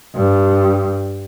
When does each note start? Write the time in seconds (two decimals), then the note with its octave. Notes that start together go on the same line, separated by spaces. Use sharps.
0.15 G2